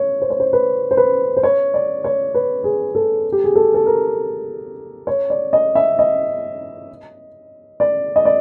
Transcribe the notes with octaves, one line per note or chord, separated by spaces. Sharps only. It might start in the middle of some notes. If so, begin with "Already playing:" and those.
Already playing: C#5
C5
C#5
C5
B4
C5
B4
C5
C#5
D5
C#5
B4
G#4
A4
G4
G#4
A4
A4
A#4
C#5
D5
D#5
E5
D#5
D5
D#5
D5